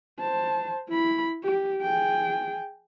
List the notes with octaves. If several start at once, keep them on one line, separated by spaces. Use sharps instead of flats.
C5 A5
E4 B5
G4
G#4 G5